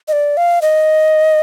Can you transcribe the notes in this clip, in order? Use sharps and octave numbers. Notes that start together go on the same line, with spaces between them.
D#5
D5
F5
D#5